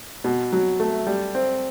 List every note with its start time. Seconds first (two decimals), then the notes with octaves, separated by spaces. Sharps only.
0.24 B2
0.53 F#3
0.80 A3
1.07 G3
1.35 C4